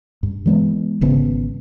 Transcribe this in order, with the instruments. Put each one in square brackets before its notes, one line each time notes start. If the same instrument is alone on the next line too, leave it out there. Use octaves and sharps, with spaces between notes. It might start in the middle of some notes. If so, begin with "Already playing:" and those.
[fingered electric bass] G2
E3 G#3 B3
G#1 C#3 B3